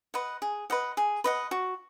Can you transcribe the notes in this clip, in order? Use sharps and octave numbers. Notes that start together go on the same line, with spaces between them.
B4 D#5 F#5
G#4
B4 D#5 F#5
G#4
B4 D#5 F#5
F#4